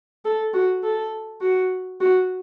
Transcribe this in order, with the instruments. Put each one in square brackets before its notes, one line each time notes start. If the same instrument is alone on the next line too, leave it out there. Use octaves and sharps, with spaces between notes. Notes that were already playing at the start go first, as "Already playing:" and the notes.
[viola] A4
F#4
A4
F#4
F#4